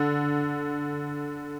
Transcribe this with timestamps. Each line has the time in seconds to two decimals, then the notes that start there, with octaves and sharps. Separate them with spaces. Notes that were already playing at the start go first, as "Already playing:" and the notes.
Already playing: D3